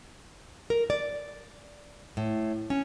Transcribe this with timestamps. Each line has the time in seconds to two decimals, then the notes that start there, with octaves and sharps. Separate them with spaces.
0.70 A#4
0.90 D5
2.17 A2
2.70 C#4